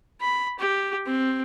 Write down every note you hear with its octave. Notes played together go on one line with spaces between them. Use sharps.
B5
G4
C4